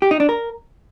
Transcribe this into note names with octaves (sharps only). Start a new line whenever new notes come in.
G4
D#4
D4
A#4